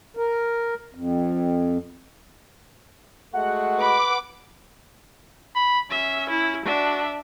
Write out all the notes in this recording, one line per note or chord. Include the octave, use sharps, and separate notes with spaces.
A#4
F2
G#3 A3 F#4 F#5
B4 B5 D6
B5
C#4 E5
E4
D4 F#4 E5